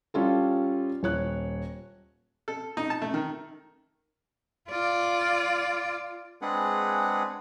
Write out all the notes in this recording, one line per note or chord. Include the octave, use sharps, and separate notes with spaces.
G3 C#4 F4 A4
D#1 C#5 F#6
A4
D#4
A5
A3
D#3
F4 D5
G#3 C4 D4 G#4 B4 F#5